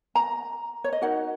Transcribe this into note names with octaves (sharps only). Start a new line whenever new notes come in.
A#5
C#5
D#5
D#4 F#4 A#4 F#5